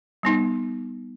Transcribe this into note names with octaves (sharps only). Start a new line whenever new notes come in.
G3 B3 D#4